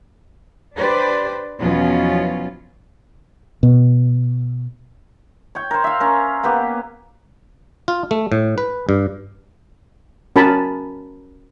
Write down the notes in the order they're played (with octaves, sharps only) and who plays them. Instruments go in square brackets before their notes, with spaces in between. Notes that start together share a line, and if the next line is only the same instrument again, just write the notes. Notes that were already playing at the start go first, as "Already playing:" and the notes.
[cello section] D4 G4 B4 C5 D5
E2 B2 F3 F#3 C#4 F4
[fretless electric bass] B2
[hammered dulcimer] C#5 G5
A#4 C5
E5 F5
C#4 A#4
A#3 B3 G4
[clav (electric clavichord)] F4
A3
A2
B4
G2
[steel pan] C#4 F#4 A#4 G#5 A5 B5